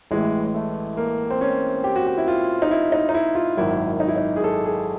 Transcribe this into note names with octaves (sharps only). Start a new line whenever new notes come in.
A1 A2 E3 G#3
G#3
A3
A#3
C4
C#4
G4
F#4
G4
E4
F4
D#4
E4
D#4
D#4
E4
F4
G#1 F#2 D#3 E4
D#4
E4
D#4
G#4
A4
G#4